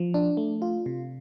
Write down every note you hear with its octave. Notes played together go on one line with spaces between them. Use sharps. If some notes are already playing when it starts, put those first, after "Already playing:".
Already playing: F3
D4
A3
F4
C3